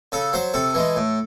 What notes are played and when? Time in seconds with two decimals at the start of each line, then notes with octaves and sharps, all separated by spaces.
0.12 C#3 A4
0.33 F#3 C5
0.54 C3 A4
0.75 E3 G#3
0.96 A2